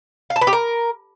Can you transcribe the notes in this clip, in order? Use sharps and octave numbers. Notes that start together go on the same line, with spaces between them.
F5
A5
B4
G4
A#4